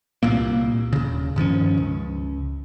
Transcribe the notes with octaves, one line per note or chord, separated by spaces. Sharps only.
C2 A#2 A#3
D#1 C#3
G2 D#3 F3 C#4
C#2